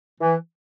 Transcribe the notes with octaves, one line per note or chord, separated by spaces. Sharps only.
E3